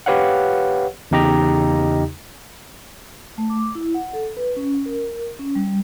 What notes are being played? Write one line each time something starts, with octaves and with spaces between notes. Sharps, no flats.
G4 B4 C#5 F5 F#5
E2 C#3 D#4 G4 D#5 A#5
A3
D6
E4
F#5
A4
B4
C#4
A#4
C#4
G3